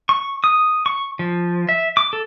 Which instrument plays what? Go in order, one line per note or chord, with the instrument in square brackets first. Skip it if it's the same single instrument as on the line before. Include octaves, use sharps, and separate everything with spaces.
[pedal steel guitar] C#6
D#6
C#6
F3
E5
D6
A4